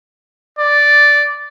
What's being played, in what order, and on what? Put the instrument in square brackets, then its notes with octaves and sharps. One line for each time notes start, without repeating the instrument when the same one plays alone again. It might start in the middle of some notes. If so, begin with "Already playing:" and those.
[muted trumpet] D5